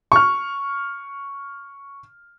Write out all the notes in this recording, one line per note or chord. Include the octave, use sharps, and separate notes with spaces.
C#6 F6